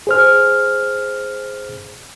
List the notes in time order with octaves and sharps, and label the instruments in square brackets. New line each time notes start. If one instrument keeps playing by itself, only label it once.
[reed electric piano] G#4 C5 F6